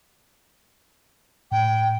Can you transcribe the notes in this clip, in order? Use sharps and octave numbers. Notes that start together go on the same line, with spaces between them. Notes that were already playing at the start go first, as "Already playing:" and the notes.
A2 G5